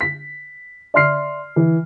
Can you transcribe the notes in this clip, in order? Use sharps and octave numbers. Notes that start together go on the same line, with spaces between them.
B6
D5 E5 C6 F6 C7
E3